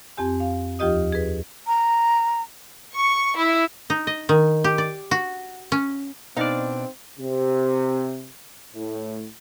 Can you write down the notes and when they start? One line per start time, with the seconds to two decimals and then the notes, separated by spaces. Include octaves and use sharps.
0.17 F2 C4 G4 G#5
0.40 F5
0.79 D#2 F3 F4 G4 D#5 D#6
1.12 G#4 B4
1.67 A#5
2.94 C#6
3.37 E4
3.90 D#4
4.07 D#5
4.29 D#3
4.64 G4
4.78 D5
5.11 F#4
5.72 C#4
6.37 B2 C4 D4 D#4 D5 F5
7.18 C3
8.73 A2